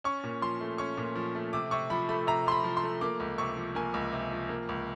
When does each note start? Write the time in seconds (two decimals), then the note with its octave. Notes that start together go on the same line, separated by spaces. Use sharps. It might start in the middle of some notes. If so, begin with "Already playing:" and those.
0.04 C#4 C#6
0.24 A#2
0.41 F3 C6
0.61 A3
0.78 C#4 C#6
0.97 A#2
1.15 F3
1.35 A3
1.53 C3 D6
1.71 C3 C#6
1.90 F3 B5
2.09 A3 B5
2.27 C3 A#5
2.46 C3 C6
2.52 B5
2.64 F3
2.77 C6
2.84 A3
3.01 A#3 D6
3.20 C#2
3.38 C3 C#6
3.57 F3
3.75 A#3 G#5
3.94 C#2
4.12 C3
4.31 F3
4.49 A#3
4.69 C#2